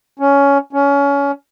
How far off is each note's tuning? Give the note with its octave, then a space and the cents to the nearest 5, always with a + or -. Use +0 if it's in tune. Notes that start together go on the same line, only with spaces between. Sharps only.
C#4 +15
C#4 +25